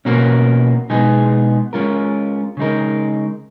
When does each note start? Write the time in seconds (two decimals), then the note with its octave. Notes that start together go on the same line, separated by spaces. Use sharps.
0.05 B2 A#3 C#4 F#4 A#4
0.90 B2 G#3 B3 D#4 G#4
1.73 G#3 C#4 F4 A#4
2.57 C#3 G#3 D#4 A#4